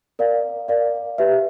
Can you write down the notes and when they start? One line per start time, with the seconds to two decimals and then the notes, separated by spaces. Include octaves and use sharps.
0.19 A#4 D5 F5
0.68 A#4 D5 F5
1.18 G4 B4 E5